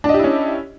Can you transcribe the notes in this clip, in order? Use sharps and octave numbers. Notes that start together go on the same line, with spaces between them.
C#4 D4 E4 G4 D#5